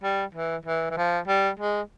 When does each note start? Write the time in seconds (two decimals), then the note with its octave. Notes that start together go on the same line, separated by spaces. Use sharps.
0.03 G3
0.35 E3
0.65 E3
0.91 E3
0.97 F3
1.28 G3
1.59 G#3